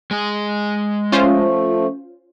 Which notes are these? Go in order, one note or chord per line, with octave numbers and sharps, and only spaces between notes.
G#3 G#4
F3 A3 C#4 F4 C5